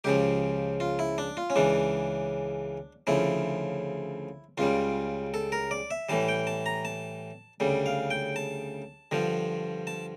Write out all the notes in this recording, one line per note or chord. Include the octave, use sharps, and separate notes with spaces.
C#2 C#3 F3 G4
F4
E4
D4
F4
C#4
C#2 C#3 E3 D4
D2 C#3 F3 E4
C#2 C#3 G3 F4
A4
A#4
D5
E5
A2 E3 G3 A5
G5
A5
A#5
A5
D2 C#3 G3
F5
G5
A5
G2 D3 F3
A5